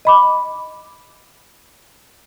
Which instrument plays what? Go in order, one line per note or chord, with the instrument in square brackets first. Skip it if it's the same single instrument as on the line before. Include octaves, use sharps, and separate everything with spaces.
[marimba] D#5 B5 D6